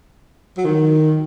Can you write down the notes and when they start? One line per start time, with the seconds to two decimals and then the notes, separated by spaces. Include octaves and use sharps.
0.57 F#3
0.65 D#3